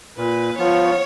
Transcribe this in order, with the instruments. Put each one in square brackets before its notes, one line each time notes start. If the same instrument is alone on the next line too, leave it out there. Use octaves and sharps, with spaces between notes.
[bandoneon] A#2 [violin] B4
[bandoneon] F3 B3 F4 [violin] C#5